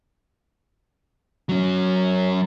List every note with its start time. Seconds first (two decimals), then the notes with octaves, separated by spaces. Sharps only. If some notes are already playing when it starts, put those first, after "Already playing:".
1.49 F#3 C#4